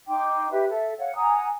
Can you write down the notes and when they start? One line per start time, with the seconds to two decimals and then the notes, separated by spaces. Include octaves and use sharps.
0.07 D#4 G5 C6 D6
0.51 G4 B4 E5
0.68 A4 E5
0.99 C#5 F5 F#5
1.16 F#5 G#5 A#5 D#6